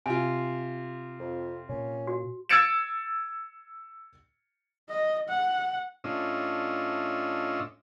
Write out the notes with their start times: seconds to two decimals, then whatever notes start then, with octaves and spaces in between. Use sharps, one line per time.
0.06 C3 F4 G#5
1.20 F2
1.69 A#2 C#4
2.07 F#4
2.49 E6 G#6 A6 C#7 D7 E7
4.89 D#5
5.29 F#5
6.04 A2 C#4 D4 F4 D#5 E6